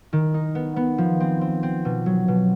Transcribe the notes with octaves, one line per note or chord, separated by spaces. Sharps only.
D#3
D#4
B3
B3
F3
C4
C4
C4
B2
F#3
B2